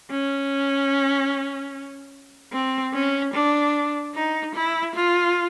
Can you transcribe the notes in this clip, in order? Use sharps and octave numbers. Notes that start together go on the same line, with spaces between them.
C#4
C4
C#4
D4
D#4
E4
F4